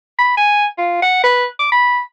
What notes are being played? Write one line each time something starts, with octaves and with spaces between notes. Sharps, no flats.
B5
G#5
F4
F#5
B4
D6
B5